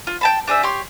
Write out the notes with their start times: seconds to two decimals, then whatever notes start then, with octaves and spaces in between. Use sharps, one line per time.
0.07 F4
0.21 G5 A5 B5
0.48 D4 G#4 C5 E5
0.63 G4 C#5 C6